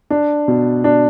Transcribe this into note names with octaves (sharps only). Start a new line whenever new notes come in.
D4
B2
D4